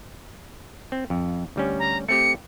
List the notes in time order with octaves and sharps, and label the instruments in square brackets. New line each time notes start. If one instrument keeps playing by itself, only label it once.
[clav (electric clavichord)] C4
F2
D2 G3 C#4
[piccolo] A#5
[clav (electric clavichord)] A3 C4 G4 [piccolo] C#7